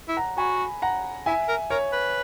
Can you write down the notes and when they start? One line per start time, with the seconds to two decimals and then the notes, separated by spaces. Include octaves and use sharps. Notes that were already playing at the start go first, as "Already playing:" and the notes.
0.08 E4
0.17 F#5 A#5
0.38 F#4 G#5 B5
0.82 F#5 A#5
1.26 E4 E5 G#5
1.48 A#4
1.70 A#4 C#5
1.93 B4